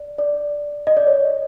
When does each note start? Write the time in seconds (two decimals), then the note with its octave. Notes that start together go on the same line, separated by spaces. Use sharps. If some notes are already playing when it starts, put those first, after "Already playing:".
Already playing: D5
0.18 D5
0.87 D#5
0.97 D5
1.07 C#5